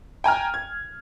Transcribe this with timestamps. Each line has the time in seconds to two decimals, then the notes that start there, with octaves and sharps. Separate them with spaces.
0.24 G5 G#5 A#5 F6
0.54 G#6